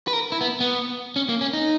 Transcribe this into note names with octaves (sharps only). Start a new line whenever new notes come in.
B4
A#4
E4
B3
B3
C#4
A#3
C#4
D#4